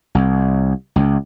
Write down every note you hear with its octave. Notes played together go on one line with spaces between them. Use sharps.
C2
C#2